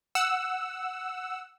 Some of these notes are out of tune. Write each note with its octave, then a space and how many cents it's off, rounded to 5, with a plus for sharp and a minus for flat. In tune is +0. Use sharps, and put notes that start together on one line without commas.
F#5 +0 E6 +0